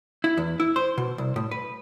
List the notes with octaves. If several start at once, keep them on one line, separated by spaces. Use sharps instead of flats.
E4
E2
E4
C5
B2
C2
A2
B4